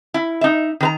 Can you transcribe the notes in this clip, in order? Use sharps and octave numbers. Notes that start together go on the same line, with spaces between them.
E4
D#4 E5
D#3 B4 A#5